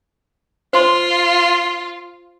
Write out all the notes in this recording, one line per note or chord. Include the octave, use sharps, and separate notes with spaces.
F4 C5 C6